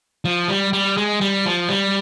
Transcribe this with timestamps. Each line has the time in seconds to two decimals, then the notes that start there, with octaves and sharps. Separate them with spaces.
0.25 F3
0.48 G3
0.73 G3
0.97 G#3
1.21 G3
1.45 F3
1.69 G3